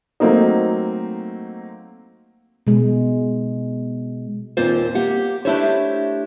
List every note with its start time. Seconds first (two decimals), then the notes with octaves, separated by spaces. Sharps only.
0.20 F#3 A3 A#3 C4 D#4
2.67 B2 G#3
4.57 D#2 A#2 A#3 C4 F4 C5
4.95 A#3 G4 F#5
5.45 A3 D4 E4 G4 C5 C#5